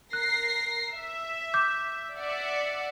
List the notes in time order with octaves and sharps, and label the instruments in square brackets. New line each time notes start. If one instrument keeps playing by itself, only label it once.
[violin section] A#4 A#6 C7 [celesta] F#6
[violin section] E5
[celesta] D6 G6
[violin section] D5 E5 F#5